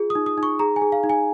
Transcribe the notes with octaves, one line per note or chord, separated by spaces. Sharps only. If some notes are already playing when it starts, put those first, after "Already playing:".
Already playing: F4 G#4
D#6
D#4
D#6
D#4
C#6
G#4 A#5
G#5
G#4
F5
D#4
G#5